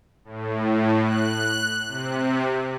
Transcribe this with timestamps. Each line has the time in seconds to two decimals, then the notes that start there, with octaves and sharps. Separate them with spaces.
0.25 A2
1.03 F#6
1.88 C3